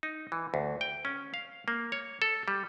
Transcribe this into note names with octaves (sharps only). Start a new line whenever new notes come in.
D#4
E3
D2
G5
C#4
F5
A#3
C#5
A4
G3